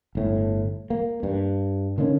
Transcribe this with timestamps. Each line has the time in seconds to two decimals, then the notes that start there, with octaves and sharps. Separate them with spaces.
0.15 G1 A2
0.90 A#3
1.23 G2
1.98 D3 D#3 A#3 C#4